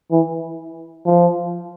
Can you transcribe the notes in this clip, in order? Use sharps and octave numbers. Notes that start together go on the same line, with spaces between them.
E3
F3